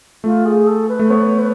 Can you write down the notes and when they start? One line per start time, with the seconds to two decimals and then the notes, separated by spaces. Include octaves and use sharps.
0.24 A3 F4
0.45 G#4
0.67 A4
0.88 B4
0.99 A3
1.10 B3 C#5
1.39 B4